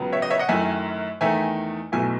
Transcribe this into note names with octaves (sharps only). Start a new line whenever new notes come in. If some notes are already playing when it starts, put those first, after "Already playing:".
Already playing: C#2 C#3 F#3 B3
C#5 E5
D#5
C#5 E5
D#5 F#5
F#2 D#3 A3 E4 E5 G#5
E2 D#3 A3 D#4 E5 G#5
B1 B2 A3 E4 E5 G#5